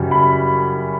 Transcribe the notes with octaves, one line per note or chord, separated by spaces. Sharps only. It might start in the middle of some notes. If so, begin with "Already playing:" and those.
Already playing: F#2 C#3 G3
B5